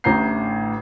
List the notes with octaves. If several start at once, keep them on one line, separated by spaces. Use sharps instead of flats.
A1 D2 A2 A#5 G6 C7